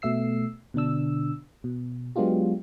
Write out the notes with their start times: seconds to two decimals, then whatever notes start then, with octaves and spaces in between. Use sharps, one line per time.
0.02 B2 A3 E5 E6 C7
0.74 B2 D3 D4 E6
1.64 B2
2.16 F#3 G#3 B3 D4 F4 G4